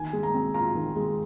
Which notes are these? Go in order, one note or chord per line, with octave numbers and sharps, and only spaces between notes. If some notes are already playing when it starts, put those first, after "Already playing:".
Already playing: D#3 G#5
G#3
A#5
C4
F4 A#5
D#3
G#3